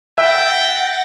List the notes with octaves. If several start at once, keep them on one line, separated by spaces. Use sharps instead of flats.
E5 F#5 G5 A6 A#6